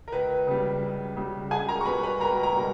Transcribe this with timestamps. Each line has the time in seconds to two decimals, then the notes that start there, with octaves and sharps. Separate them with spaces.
0.08 A#4
0.12 C#2 B4
0.47 C#3 G3
0.82 C#2
1.17 C#3 G3
1.51 C#2 G#4 G#5
1.68 A#4 A#5
1.81 C#6
1.86 B2 G3 B4 B5
2.03 B4 B5
2.21 C#2 A#4 A#5
2.43 A#4 A#5
2.55 B2 G3